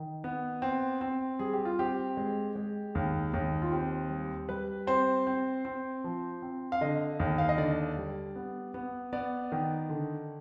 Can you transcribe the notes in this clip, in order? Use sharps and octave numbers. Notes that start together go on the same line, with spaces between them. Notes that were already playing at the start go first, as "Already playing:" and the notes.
Already playing: D#3
B3
C4
C4
G3 G#4
G4
F4
C4 G4
G#3
G#3
D#2
D#2
F4
C4 G4
G3
G3 B4
C4 C5
C4
C4
F3
C4
F5
D3 D#5
D#2
F5
D#5
D3 D5
G3
B3
B3
B3 D5
D#3
D3